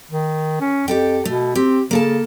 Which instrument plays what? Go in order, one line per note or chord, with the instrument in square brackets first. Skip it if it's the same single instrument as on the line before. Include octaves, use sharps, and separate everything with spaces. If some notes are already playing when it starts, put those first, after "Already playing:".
[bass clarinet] D#3
C#4
[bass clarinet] F2 [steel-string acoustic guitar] G4 A4 G5
[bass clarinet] B2 [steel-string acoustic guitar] A3
[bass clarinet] C4 [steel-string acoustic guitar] G4
[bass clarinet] C#3 [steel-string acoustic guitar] A#3 A4 A5